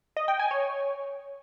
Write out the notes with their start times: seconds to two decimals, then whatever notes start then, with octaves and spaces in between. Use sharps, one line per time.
0.17 D#5
0.28 G5
0.39 G#5
0.51 C#5